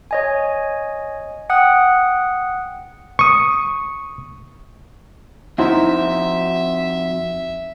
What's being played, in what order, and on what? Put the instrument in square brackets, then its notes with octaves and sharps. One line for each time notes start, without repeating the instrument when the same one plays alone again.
[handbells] C#5 D#5 G#5
F#5 G5 D#6 F#6
[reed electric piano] C#6 D#6
[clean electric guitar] F2 F#4 C5 [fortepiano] D#4 E4 [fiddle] E5